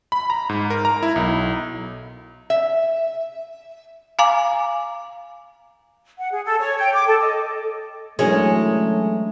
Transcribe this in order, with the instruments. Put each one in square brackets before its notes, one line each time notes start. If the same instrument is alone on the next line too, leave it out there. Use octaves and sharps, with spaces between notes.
[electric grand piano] B5
A#5
G#2
A#4
A#5
E4
B1
[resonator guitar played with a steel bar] E5
[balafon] F5 G#5 A#5 D6
[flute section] F#5
G#4
A4
C#5
G5
D6
A4
D#5
[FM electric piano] E3 F#3 D4 [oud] G#3 [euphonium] A3 [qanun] C#4 A#4 C#5